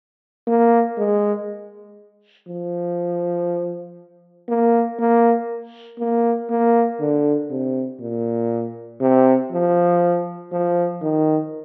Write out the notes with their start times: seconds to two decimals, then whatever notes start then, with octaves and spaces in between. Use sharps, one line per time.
0.47 A#3
0.98 G#3
2.48 F3
4.49 A#3
4.99 A#3
5.99 A#3
6.50 A#3
7.00 D3
7.51 C3
8.01 A#2
9.01 C3
9.52 F3
10.52 F3
11.02 D#3